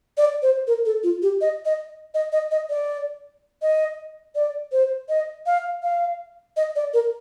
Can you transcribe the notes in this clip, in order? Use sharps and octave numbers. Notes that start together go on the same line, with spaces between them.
D5
C5
A#4
A4
F4
G4
D#5
D#5
D#5
D#5
D#5
D5
D#5
D5
C5
D#5
F5
F5
D#5
D5
A#4